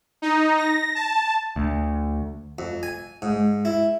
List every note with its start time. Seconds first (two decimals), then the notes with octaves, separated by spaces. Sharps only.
0.22 D#4
0.57 A#6
0.95 A5
1.56 D2
2.59 F2
2.83 G#5
3.22 G#2
3.65 E4